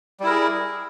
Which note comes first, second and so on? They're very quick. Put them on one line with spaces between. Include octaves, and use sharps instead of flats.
G3 E4 A#4 G#4